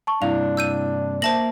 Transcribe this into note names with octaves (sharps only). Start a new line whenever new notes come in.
A5 C#6
G2 C3 D4 E4 F5 F7
E6 G6 D#7
A#3 C5 E5 A5 A#6 F#7